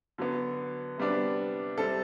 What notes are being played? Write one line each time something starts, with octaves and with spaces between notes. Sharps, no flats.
D3 F#3 B3
C3 G3 B3 D4
C3 G3 C4 A4